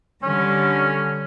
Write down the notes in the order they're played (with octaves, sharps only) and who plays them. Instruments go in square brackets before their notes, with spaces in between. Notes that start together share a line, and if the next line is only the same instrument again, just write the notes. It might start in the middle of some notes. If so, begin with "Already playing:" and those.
[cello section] D3 G3 [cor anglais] C#4